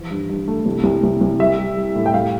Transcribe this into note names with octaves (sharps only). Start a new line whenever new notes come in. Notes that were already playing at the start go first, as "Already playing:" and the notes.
Already playing: E3 F3
G2
G2
A3
C2
C2
C2
C2
G3 E5
G3
G3
A2
G5
G3 F5